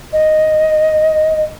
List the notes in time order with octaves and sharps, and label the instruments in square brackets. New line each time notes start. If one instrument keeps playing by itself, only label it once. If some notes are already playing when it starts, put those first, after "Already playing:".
[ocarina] D#5